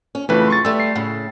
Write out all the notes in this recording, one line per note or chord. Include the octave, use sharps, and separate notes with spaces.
C#4
F2 C#3 E3 A3 B4
C6 C#6 A6
G3 A3 E6
C7
A2 C#3